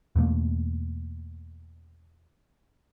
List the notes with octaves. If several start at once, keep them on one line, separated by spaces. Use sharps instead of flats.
E2 B2 A3 A#3